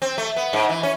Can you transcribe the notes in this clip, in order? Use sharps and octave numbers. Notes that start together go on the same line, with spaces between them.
C4
A3
B3
G#2
E3
C#4